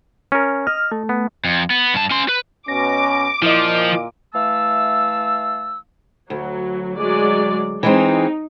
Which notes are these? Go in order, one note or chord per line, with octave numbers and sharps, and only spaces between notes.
C#4 A#4
D#5 F6
A3
B3
F2
B3
G2 A5
C#4 C6
B4
B2 C#4 D6 A#6
A#2 F3 E4 D#5
E3 A3 F5 A5 E6
D2 F#3
F#3 G#3 D5
E3 G#3 C4 D#4